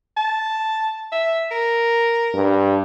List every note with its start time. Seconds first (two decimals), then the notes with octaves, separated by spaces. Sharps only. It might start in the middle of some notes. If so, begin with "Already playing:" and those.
0.17 A5
1.12 E5
1.51 A#4
2.35 G2